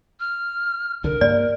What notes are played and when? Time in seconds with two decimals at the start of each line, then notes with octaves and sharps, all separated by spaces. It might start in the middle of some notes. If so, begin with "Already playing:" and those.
0.20 F6
1.04 C2 D3 A#4
1.21 G2 A#3 D5